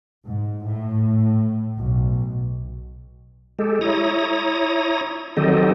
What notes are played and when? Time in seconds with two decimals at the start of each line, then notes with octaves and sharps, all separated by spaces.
0.25 G#2
0.63 A2
1.77 B1
3.59 G#3 G4 A4
3.81 E4 C#5 A#5 D#6
5.37 D#3 F#3 C4 G4 A4 D#5